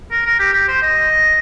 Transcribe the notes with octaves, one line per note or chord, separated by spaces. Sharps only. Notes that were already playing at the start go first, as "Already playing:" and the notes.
A#4
A#4
G4
G4
C5
D#5